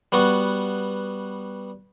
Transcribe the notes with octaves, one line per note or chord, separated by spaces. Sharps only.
G3 B3 F#4